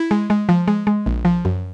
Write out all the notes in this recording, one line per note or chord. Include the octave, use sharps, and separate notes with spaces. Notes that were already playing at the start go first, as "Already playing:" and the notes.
Already playing: E4
G#3
G#3
F3
G#3
G#3
A#1
F3
F#2